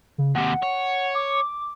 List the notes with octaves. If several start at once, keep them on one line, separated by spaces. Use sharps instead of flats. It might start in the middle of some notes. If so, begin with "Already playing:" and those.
C#3
D#2 C3 F#5
C#5
D6